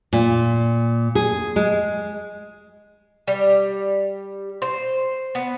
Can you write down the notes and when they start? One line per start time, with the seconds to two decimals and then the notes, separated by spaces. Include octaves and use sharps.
0.13 A#2
1.15 G#4
1.56 G#3
3.27 G3
4.62 C5
5.35 B3